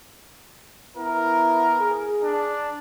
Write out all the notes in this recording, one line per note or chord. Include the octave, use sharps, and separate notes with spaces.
B3 E4 A#4
G#4
D4